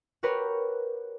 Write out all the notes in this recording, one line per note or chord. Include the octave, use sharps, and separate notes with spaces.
F#4 G4 A#4 B4 C#5